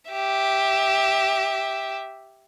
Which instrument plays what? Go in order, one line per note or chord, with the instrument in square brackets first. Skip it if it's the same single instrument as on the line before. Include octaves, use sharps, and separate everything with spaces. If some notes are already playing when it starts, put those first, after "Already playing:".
[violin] G4 E5